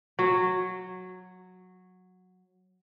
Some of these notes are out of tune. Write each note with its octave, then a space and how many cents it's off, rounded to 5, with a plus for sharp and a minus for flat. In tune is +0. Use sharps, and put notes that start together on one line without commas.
F#3 -10